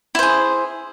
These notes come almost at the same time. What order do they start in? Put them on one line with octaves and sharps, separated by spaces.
E4 C5 G#4